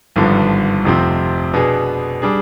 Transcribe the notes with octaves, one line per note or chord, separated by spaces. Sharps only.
G#1 G2 D3 F3 B3
F1 F2 C3 F3 C4
B2 B3 D4 G#4
G3 D4 G#4